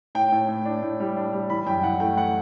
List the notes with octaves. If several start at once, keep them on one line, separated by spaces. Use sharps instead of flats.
A2 G5
A2
A2
D4
A2
G3
D4
G3
E3 B5
F#2 G5
E3 F#5
A3 G5
F#5